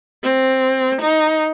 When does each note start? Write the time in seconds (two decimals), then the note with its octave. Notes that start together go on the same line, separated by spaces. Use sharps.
0.24 C4
1.01 D#4